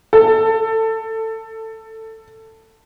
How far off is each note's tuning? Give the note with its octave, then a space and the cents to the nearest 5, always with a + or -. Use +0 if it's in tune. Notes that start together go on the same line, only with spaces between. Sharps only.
A4 +15